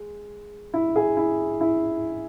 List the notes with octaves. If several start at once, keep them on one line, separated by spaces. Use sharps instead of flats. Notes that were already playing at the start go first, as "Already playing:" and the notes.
Already playing: G#3
E4
G#4
E4
E4